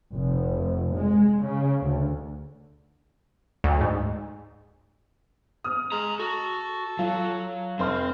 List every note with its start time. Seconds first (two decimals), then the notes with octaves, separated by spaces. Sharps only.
0.12 F1
0.94 G#3
1.43 C#3
1.82 D2
3.64 D2
3.81 G#2
5.64 D#6 F6
5.92 G#3 G#5 A#5
6.20 F#4 A4
6.99 F#3 F4
7.79 F1 C4 C6 F6